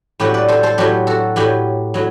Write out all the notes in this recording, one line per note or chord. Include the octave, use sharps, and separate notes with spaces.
A2 F#3 G4 B4
B4 D5
A4 C5
A4 C5
A2 F#3 G4 B4
F#4 A4
A2 F#3 G4 B4
A2 F#3